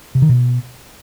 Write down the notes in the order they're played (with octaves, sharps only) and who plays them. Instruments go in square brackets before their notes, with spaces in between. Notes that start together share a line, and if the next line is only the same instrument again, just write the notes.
[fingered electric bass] C3
D#3
B2